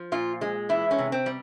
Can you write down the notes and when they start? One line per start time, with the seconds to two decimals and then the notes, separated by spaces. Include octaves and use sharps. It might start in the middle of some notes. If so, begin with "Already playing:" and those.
Already playing: F3
0.12 A#2 F4
0.41 G#3
0.69 E3 E4
0.91 C#4
0.98 C3
1.12 C4
1.26 G3